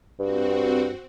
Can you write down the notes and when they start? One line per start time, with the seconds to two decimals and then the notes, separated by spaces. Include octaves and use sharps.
0.19 G2 C4 F#4